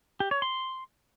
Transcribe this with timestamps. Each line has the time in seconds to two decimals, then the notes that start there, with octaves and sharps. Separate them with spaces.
0.20 G4
0.31 C#5
0.42 C6